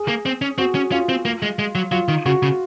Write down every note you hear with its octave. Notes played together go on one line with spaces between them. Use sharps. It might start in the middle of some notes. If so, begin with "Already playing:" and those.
Already playing: G#4
A#3
C4
C#4
C4 F#4
C#4
C#4 F4
C4
A#3
G#3
G#3
F#3
F#3 F4
D#3
C#3 F#4
C#3